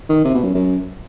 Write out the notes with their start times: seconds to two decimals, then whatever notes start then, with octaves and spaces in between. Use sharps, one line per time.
0.09 D#3
0.25 C3
0.34 B2
0.44 F#2
0.55 F#2